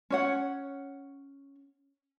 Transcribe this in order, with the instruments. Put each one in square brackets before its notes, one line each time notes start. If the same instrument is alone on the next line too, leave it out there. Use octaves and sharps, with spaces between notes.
[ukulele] C#4 C#5 F#5